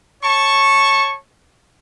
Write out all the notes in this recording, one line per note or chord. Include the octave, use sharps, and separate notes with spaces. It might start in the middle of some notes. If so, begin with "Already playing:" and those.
C#5 A5 C#6